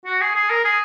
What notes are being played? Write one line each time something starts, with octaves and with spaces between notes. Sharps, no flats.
F#4
G#4
G#4
A#4
G#4